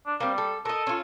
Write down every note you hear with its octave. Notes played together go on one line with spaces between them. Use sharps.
D4
G3 A#3 C4
A4
A4 A#4 D#5
C#4 F4